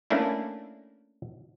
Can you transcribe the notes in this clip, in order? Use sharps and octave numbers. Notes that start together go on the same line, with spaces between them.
A3 A#3 C#4 D4 E4